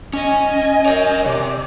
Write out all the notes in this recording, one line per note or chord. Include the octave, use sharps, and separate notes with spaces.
C#4 D#5 G#5
A#4 C#5
C3 D5